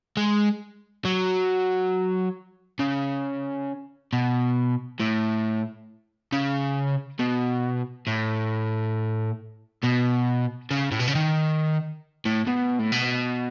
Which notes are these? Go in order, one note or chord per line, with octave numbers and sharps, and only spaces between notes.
G#3
F#3
C#3
B2
A2
C#3
B2
A2
B2
C#3
A2
B2
C#3
D#3
A2
B2
A2
B2